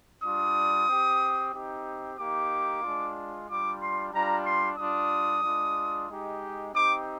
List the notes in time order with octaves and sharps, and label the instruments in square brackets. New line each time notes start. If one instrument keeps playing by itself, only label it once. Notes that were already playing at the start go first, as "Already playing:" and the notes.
[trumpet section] G3 D4 F4 D#6
C4 G4
C4 D#4 G4
A#3 D#4 G4 D6
G#3 D4 F4
G3 D4 F4 D6
C6
G3 D4 F4 A#5
C6
G3 D4 F4 D#6
G#3 D4 F4
G#3 D#4 G4
C4 D#4 G4 D6